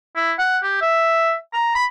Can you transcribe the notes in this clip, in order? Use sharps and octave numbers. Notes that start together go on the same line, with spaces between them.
E4
F#5
G4
E5
A#5
B5